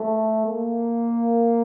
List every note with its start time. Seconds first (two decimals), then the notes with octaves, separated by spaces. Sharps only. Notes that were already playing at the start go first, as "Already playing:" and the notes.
Already playing: A3
0.47 A#3